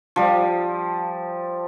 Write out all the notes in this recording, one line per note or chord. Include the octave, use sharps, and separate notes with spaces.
F3 G3